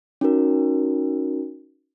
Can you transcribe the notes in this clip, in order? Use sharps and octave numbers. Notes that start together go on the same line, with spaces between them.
C#4 D#4 F#4 A#4